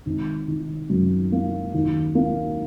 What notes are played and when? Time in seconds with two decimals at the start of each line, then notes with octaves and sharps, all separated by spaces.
0.06 G#1
0.48 D#3
0.90 F#2
1.32 A#3
1.74 D#2
2.15 A#3